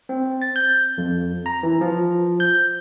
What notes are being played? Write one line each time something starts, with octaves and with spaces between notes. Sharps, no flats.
C4
A6
G6
F2
A#5
E3
F3
G6